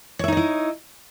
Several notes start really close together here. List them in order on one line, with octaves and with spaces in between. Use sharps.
C#5 E5 D#4 D#5 E4